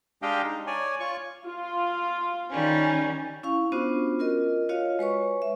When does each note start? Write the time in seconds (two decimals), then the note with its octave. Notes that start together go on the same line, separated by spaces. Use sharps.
0.22 G#3 D4 G4 D#5 F5 G5
0.43 D#4
0.67 C#5 D5 G#5
1.00 F4 C#5 C#6
1.47 F4
2.50 D#3 G3 C#4
3.43 C#4 E4 F5 C#6
3.72 B3 C#4 D4 F4 F#4 C5
4.19 F4 A#4 D#5
4.69 F4 F#4 C#5 D#5 F5
4.99 G#3 B4 C#5 C#6
5.42 E5